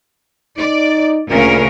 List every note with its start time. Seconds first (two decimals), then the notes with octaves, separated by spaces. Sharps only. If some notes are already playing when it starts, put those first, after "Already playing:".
0.58 D#4 D5
1.30 D2 A#2 C#3 A#4